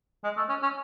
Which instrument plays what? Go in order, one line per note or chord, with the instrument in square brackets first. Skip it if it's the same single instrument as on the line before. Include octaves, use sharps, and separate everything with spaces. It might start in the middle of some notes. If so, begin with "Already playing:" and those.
[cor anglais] G#3
A3
C#4
C#4